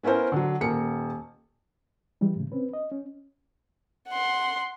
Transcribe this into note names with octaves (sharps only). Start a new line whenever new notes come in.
B3 C#4 E4 A#4 C5
D3 F#3
D#1 A#3 C#7
E3 G3 G#3
A2 C#3
C4 C#4 B4
D#5
C#4
F#5 C6